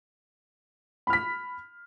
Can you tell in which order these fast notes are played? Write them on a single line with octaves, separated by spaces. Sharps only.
B5 F6 B6